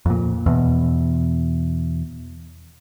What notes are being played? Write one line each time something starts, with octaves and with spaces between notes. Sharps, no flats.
F2 A#2
E2 B2